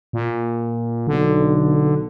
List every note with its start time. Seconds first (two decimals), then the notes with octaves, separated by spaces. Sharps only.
0.13 A#2
1.07 B1 D3